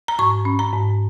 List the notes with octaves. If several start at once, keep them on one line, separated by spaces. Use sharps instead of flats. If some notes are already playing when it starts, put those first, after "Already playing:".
A#5
G#2 C#6
C#4
A#5
G#2